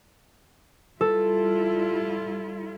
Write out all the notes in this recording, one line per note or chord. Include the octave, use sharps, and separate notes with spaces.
G3 E4 F4 A4